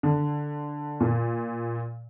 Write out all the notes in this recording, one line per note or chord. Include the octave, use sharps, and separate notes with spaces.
D3
A#2